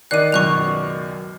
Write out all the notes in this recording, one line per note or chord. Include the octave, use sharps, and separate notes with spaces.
D#3 D5 F#6 C7 D#7
C#2 F#2 B2 C#6 F#6 F7